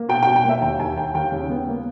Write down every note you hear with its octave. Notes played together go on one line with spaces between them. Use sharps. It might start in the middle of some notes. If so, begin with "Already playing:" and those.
Already playing: A#3
B2 G5
G5
B2
G5
A#3 E5
D#2 G5
D#2 G#5
D#2 G5
D#2 G5
C#3
B3
A#3